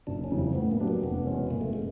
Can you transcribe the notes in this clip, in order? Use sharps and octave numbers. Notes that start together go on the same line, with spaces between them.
F#1 D4
C#4
F2 C#3 E3 G3
C4
A2 B3
A#3
F#3 B3 D4 G4
A#3
F1 B3
E2 B2 G#3 C#4
F#1 A#3
A3
G#3